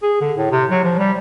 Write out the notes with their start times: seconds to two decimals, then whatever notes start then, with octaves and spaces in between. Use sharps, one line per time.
0.02 G#4
0.21 D3
0.37 A2
0.51 C3
0.70 F#3
0.84 F3
0.99 G3